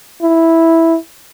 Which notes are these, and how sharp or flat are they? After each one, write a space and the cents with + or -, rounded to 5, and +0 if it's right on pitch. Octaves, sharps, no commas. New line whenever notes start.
E4 -5